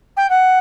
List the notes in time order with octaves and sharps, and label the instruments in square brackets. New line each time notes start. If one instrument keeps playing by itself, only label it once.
[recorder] G5
F#5